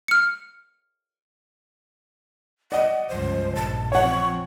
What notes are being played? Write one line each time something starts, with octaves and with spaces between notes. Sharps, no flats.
F6 C#7
D5 D#5 F#5
C#2 G2 F3 C5
A#1 G2 A5
F3 C4 C#5 F#5 C#6